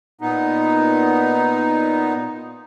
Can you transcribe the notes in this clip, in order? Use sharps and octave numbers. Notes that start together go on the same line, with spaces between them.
A#2 B3 D#4